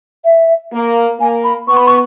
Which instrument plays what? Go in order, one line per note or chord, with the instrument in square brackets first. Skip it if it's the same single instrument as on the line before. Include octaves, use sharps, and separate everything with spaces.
[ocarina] E5
[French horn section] A#3
[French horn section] A#3 [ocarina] G#5
[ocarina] B5
[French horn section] B3 [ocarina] C#6
[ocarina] B5
C#6